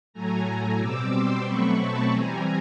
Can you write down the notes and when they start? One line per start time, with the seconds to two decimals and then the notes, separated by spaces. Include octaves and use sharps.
0.13 A2 F#3 A3 G#5 A#5
0.79 B2 G3 C4 D6 E6
1.12 C6 D6
1.44 B2 F#3 A3 C4 B5 C#6
1.77 A5 B5
2.10 E3 G3 C4 G#5 A#5